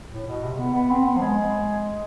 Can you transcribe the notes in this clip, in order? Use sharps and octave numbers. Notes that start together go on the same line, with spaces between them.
A2
B2
C3
B3
B3
C4
B3
F3
G#3